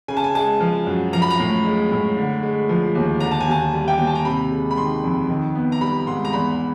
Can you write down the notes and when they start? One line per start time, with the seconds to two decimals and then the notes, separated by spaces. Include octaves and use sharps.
0.08 C#3 G#5
0.17 A5
0.24 G#5
0.35 G#3 A5
0.61 F3
0.87 F#2
1.13 F3 A#5
1.22 B5
1.30 A#5
1.40 A2
1.64 G#3
1.91 A2
2.17 D3
2.43 G#3
2.69 F3
2.95 D#2
3.20 D3 A#5
3.31 A5
3.41 G#5
3.48 D#2 A5
3.73 G3
3.88 G5
3.98 D#2 G#5
4.07 A5
4.15 A#5
4.25 C3 B5
4.51 G#3
4.71 B5
4.77 D#3 C6
5.03 F2
5.29 D#3
5.55 B3
5.72 A#5
5.81 G3 B5
6.07 G#2 C6
6.25 A#5
6.33 E2 B5